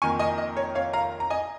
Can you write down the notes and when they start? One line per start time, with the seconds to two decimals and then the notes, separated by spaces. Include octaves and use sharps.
0.02 F2 D#3 A#3 G#5 C#6
0.19 D#5 G#5
0.38 D#5
0.57 C#5
0.75 C#5 F5
0.93 F5 A#5
1.20 A#5
1.30 D#5 G#5